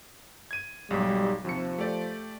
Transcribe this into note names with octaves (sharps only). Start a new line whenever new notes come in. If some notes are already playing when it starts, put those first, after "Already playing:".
G#6 D#7
B1 G#2 G3
D#2 C3 F3 C#7
A3 G4 D5